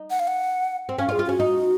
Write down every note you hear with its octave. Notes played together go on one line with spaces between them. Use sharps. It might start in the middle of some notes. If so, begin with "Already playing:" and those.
Already playing: D#4
F#5
F5
F#5
C4
C#4 F5
F4
G#4
F4
C#4 F#4
D#4